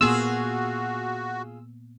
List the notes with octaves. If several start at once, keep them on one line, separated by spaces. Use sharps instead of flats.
A#2 A#3 B3 F4 F#4 G#4 E6